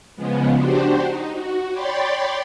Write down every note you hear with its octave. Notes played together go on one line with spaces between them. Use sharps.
C#3 F3 G#3 B3
D4 F#4 G4 C5
D#4
F#4
C#5 D5 G5 B5 C6 A6